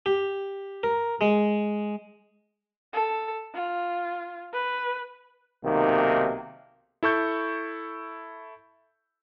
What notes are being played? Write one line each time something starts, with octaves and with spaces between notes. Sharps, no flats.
G4
A#4
G#3
A4
F4
B4
B1 C3 D#3 A#3
E4 A4 C#6 G6